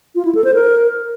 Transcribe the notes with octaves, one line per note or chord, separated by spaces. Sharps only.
F4
E4
A4
C5
A#4